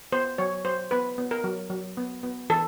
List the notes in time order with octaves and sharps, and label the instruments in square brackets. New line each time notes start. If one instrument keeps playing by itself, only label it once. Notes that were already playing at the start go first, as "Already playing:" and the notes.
[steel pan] B3 C5
F#3 C#5
F#3 C5
B3 B4
B3
A#4
F#3
F#3
B3
B3
E3 A4